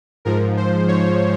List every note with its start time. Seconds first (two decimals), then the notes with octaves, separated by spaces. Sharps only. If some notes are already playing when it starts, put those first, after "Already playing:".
0.25 G#2 F3 A#4
0.57 C5
0.88 C#5